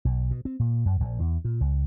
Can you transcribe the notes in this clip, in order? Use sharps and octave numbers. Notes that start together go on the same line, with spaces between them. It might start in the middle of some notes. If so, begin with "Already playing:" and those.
B1
B2
C4
A#2
F#2
A#1
E2
A#2
C#2